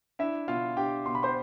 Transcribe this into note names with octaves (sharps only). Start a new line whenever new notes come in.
D4 E4 E5
B2 F4 F5
D4 G4 G5
B2 C6
B5
C5 C6